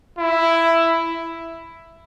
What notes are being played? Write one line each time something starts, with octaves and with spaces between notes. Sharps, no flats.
E4